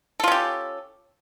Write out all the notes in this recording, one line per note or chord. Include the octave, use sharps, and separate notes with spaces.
C#4 F4 G4 A4